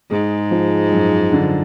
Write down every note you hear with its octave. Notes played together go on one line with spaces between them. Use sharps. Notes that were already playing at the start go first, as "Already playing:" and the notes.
G#2 G#3
F3
F#2
D3